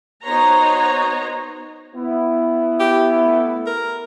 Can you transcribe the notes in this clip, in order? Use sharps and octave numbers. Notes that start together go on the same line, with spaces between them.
B3 D#4 F#4 C5 C#5 A#5
B3 E4
G4
A3
A#4